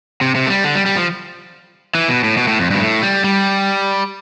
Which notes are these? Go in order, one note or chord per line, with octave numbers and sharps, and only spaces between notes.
C3
C3
A3
G3
D3
G3
G3
F3
E3
B2
A2
B2
A2
F2
G2 B2
A2
G3
G3